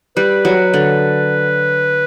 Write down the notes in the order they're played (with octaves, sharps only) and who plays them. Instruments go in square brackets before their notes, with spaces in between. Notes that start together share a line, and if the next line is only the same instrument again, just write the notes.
[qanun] G3 [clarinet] B4
[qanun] F#3
D3